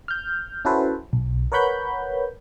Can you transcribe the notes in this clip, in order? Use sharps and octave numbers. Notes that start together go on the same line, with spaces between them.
F6 G6
C#4 E4 F#4 A4 B4 C5
B1
A#4 B4 C#5 F#5 B5 G6